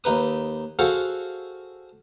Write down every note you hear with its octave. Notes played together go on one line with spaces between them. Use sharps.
D#2 D#4 B4 D#6
F#4 G#4 A4 C5 F5 F#5